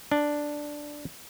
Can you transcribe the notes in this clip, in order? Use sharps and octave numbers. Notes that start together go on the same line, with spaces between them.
D4